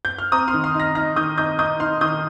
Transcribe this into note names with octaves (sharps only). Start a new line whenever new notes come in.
G6
F6
C4 A#5 D#6
C6 F6
D#3
C6 F6
D#4
F6 A#6
D#4 F6 A#6
D#3 D#6 G6
D#4 D#6 G6
D#4 D#6 G6
D#4 C6 F6
D#3 D#6 G6